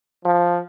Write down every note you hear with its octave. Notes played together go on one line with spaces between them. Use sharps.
F3